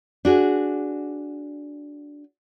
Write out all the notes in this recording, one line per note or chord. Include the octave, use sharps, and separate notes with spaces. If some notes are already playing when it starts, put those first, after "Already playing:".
D4 F#4 G#4